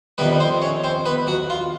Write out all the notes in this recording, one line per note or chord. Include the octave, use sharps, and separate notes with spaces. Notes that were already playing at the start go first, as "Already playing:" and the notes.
F2 C3 D#3 G3 B3 B4
C4 C5
C#4 C#5
C4 C5
B3 B4
F#3 F#4
F4